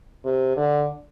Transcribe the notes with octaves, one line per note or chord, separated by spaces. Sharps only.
C3
D3